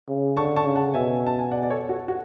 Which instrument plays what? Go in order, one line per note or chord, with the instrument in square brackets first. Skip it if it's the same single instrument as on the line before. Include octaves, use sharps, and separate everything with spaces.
[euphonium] C#3
[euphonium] D3 [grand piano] A5 C#6
[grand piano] A5 C#6
[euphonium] C#3
[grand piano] F#5 A5
[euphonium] B2 [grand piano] E5 G#5
[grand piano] A5
G#5
D5 F#5
D5
A4 C#5
F#4 A4
F#4